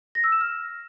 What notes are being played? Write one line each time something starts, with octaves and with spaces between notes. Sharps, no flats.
A#6
E6
E7
F6